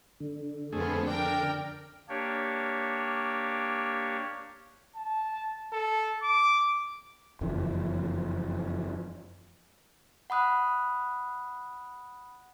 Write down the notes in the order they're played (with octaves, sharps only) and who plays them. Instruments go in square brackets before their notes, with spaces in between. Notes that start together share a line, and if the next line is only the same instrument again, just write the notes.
[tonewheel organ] D3
[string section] F2 F3 B3 [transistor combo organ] A3 G#4
[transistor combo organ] D4 [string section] A#4 G5
[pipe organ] A#3 D4 G4 C#5
[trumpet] A5
A4
D6
[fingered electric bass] F#1 F2 E3
[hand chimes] F#5 B5 D#6 F#6